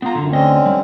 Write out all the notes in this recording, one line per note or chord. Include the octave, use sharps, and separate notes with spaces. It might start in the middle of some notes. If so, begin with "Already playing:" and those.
B3 F4 A#5
F#2 D3
D2 D3 C4 C#4 D#5
G3